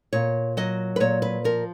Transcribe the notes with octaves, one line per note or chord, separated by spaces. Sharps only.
A#2 C#5
F#3 D#5
B4
A#2 C#5
B4
F3 A#4